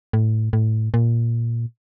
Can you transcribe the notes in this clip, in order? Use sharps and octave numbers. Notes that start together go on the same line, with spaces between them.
A2
A2
A#2